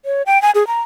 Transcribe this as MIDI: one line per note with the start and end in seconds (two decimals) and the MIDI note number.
0.05 0.22 73
0.26 0.41 79
0.42 0.51 80
0.55 0.66 68
0.67 0.81 82